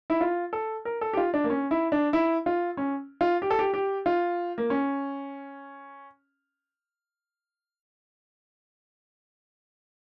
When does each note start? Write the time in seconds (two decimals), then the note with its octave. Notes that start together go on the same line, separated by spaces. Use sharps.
0.10 E4
0.21 F4
0.53 A4
0.85 A#4
1.01 A4
1.13 G4
1.17 F4
1.34 D4
1.44 A#3
1.50 C#4
1.71 E4
1.92 D4
2.13 E4
2.46 F4
2.77 C#4
3.21 F4
3.42 G4
3.50 A4
3.59 G4
3.74 G4
4.06 F4
4.58 A#3
4.70 C#4